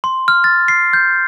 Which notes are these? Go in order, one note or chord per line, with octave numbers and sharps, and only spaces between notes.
C6
F6
A6
C7
G6